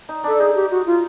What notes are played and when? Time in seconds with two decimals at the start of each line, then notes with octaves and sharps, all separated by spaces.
0.09 D#4
0.24 D4 A4
0.40 D#4 G#4
0.55 G4
0.71 F#4
0.86 F4